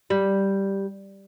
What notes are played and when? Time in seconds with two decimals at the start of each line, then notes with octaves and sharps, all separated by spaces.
0.10 G3